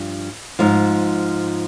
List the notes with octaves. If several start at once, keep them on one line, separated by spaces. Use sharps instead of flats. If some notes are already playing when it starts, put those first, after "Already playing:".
Already playing: G2 F3
G#2 F3